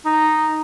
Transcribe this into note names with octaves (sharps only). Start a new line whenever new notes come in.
D#4